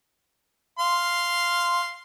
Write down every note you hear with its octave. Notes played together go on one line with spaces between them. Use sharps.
F5 C6